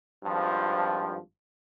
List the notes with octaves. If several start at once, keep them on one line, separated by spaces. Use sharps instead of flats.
G#1 G2 F3